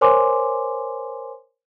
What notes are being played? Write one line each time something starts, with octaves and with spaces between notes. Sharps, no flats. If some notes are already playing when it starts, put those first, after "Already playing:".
A#4 C5 C#5 G#5 C6 D6